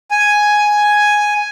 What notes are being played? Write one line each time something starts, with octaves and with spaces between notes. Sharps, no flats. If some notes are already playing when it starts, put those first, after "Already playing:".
G#5